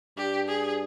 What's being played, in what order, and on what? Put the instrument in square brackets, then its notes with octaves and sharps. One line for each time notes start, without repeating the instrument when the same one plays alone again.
[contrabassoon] G2 [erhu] G4
[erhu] G#4